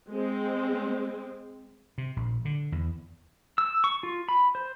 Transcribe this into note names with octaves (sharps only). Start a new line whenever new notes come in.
G#3 C4
C3
A#1
D3
E2
E6
C#6
F4
B5
C5